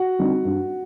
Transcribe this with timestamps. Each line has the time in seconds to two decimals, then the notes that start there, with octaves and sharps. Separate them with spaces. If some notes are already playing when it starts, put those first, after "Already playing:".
Already playing: F#4 F#5
0.19 D3 G3 C4 D#4
0.45 G2